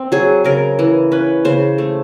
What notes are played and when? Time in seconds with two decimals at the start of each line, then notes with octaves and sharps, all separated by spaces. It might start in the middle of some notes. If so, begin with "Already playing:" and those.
Already playing: C4
0.12 F#3 G#4
0.44 C#3 A#4
0.79 E3
1.12 C#4 B4
1.45 C#3 C5
1.78 A3